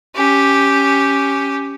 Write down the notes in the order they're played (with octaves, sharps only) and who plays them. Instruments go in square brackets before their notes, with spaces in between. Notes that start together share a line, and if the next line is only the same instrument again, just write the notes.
[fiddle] C#4 G4